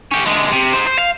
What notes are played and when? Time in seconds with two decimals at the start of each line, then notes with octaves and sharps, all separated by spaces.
0.12 C#4 G4
0.26 D3 G#3
0.53 C3
0.74 D#4 C5
0.87 C5
0.99 F5